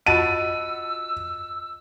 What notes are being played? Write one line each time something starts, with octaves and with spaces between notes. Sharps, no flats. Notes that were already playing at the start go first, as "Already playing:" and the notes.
F4 F#4 D#5 A5 B5 E6 D#7